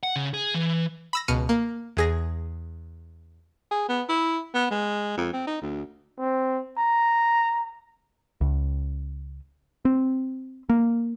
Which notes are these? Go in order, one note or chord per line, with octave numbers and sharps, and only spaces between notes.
F#5
C#3
G#4
E3
B5 E6 A#6
C#2 B2 F6 C#7 D#7
A#3
E2 G#4 A#6
G#4
B3
E4
B3
G#3
F2
C4
D#4
D2
C4
A#5
C#2
C4
A#3